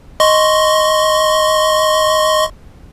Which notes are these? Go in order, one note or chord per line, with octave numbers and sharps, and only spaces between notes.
D#5 C6 C#6